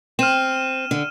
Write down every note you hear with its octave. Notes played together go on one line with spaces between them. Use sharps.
C4 F6 D#7 E7
D3